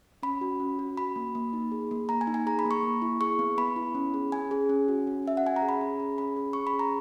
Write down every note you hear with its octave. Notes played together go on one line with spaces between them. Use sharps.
C#4 B5
F#4
C#4
F#4
F#4 B5
A#3
A#3
D#4
G#4
A#3
A#3 A#5
G#5
D#4
G#5
G#4 A#5
B5
A#3
C#6
A#3
E4
G#4 C#6
B3
B3 B5
E4
C#4
G#4
C#4 G#5
G#4
C#4
F#4
C#4
F#4 E5
F#5
C#4 G#5
A#5
G#4
B5
C#4
G#4
C#4 B5
G#4
C#4 C#6
B5
G#4
A#5